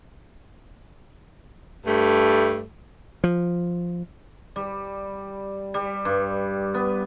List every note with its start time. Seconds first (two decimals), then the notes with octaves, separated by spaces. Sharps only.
1.85 G2 A3
3.24 F3
4.56 G3
5.74 G3
6.05 G2
6.74 B3